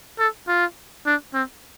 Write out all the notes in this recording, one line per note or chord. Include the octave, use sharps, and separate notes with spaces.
A4
F4
D4
C4